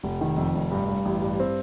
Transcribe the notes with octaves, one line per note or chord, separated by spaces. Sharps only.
F1
D#3
F2
F1
G2
G2
A1
G2
C4